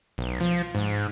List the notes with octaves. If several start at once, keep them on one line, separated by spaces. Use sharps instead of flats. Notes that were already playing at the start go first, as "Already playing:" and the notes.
B1
F3
G#2